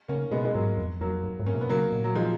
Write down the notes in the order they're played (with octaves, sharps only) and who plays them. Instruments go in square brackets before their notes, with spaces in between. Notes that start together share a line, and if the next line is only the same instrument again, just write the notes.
[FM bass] C#3 [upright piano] A#3 C#4
[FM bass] B2 [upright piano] G#3 B3
[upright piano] G#3
[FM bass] G#2 [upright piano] F#3 A#3
[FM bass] F2
[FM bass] F2 [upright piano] F#3 A#3
[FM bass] F#2
G#2
[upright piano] A#3 C#4
[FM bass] B2
[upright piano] B3
[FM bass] C#3 [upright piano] F#3 A#3
[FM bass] A#2
[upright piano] F#3
F3 G#3